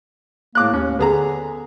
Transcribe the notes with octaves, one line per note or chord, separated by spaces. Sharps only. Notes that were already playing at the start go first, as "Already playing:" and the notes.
A2 A#3 D6 F#6
D#2 C#4
D3 B3 G#4 A#5